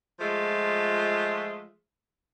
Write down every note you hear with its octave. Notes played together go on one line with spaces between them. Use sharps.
F3 G#3 A3 F4